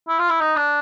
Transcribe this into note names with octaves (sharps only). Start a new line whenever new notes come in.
E4
F4
E4
D#4
D4